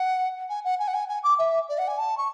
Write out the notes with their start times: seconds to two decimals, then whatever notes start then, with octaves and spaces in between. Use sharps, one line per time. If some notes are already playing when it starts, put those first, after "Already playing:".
Already playing: F#5
0.50 G#5
0.64 F#5
0.79 G#5
0.88 F#5
0.94 G#5
1.08 G#5
1.23 D6
1.39 E5
1.69 D5
1.78 F#5
1.88 G#5
1.98 A5
2.17 C#6